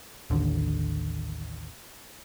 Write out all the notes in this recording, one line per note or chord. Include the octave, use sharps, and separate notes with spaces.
A1 D#2 D3